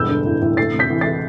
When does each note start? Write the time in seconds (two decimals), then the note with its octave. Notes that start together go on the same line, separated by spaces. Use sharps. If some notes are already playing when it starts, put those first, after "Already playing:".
Already playing: E1 G2 E6 G6
0.09 D3
0.25 A1
0.42 A1
0.57 D2 A6 C7
0.74 C3
0.79 G6 B6
0.90 E3
1.01 A6 C7